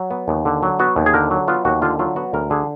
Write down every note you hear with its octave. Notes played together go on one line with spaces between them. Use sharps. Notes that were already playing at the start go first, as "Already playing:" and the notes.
Already playing: F#3
B3
D#2
D3
F#3
B3 F#4
D#2
G#4
D3 A#4
F#3
B3 F4
D#2 F#4
D3 F4
F#3 F4
B3 F#4
D2 A#4
D3 G#4